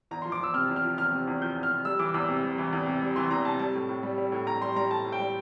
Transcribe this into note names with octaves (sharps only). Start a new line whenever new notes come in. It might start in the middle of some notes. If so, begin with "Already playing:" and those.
E2 A#5
F3 C6
D6
E2 E6
C3 F6
E2
F6
F3
E2 F6
C3
E2
F3 G6
E2
F6
C3
G3 E6
E3 D6
E2 E6
C3
G3
E3
E2
C3
G3
E3 C6
E2 A#5
C3 A5
G3 A5
A2
A2
G3
G3
A2
A2 A#5
G3 C6
G3 A#5
A2 A5
A2
G5
G3